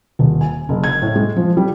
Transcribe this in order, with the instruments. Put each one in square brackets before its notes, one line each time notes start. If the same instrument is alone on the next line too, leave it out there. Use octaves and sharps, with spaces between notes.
[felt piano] D#1
G#5
F#1
G#6
A2
G#3
F3
G3